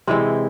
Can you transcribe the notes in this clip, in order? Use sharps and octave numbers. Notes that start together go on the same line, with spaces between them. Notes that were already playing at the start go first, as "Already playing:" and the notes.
C3 E3 G#3 C4